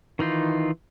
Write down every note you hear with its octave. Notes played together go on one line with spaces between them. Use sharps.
D#3 E3 D#4 F4